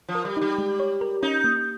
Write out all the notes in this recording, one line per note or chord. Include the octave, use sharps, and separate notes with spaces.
F3
A#4
G3
G3 D#4
G#3
C#5
A#4
C#4 D#4
A#3